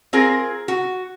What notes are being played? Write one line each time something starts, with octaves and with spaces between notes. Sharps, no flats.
C4 F4 G#4 A#4
F#4